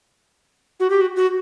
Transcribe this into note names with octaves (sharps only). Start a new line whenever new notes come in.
F#4
G4
F#4
F#4